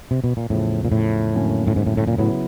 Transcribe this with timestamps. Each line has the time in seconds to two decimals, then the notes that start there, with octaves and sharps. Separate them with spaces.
0.11 C3
0.24 B2
0.37 A#2
0.50 E2 A2 C#3 F3
0.85 A#2
0.92 A2
1.35 F2 D3 F#3 A#3 C#4
1.67 A2
1.76 G#2
1.87 A2
1.97 A2
2.08 A#2
2.18 A2 C#3 F#3 B3 E4